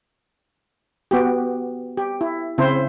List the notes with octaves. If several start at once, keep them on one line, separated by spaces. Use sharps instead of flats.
B3 F#4 G4
G4
E4
C#3 C4 E4 C5